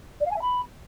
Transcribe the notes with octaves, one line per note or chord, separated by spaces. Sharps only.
D5
F5
G#5
E5
B5